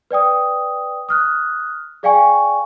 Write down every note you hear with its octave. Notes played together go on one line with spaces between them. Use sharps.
B4 D5 G5 D#6
D#6 F6 F#6
G#4 D5 F5 G5 G#5 C#6